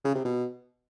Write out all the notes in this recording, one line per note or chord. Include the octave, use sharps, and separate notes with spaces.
C#3
C3
B2